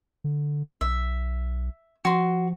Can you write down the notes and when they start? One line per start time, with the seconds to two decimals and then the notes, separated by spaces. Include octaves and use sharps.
0.24 D3
0.81 B1 E5
2.05 F3 F#4 C6